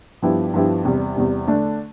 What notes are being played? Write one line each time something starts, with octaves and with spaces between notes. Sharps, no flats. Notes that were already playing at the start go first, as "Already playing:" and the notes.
G2 F3 B3 E4 G4
G2 F3 B3 E4 G4
E2 C3 G3
E2 C3 G3
D3 A3 D4